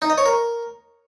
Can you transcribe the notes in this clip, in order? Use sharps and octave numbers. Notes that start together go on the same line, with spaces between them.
D#4
D#5
C#5
A#4